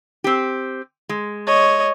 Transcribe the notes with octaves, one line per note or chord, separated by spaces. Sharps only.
C4 G4
G#3
C#5 D#5